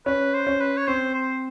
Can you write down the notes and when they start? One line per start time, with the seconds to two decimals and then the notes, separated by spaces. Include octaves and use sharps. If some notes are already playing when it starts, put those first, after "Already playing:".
0.06 C#4 B4
0.34 C5
0.47 C#4
0.61 B4
0.77 C#5
0.87 C4 C5
1.14 C5